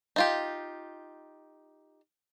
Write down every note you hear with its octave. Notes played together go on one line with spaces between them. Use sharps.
D#4 F4 G4